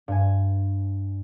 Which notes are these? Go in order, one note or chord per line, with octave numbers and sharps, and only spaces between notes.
G2 G#5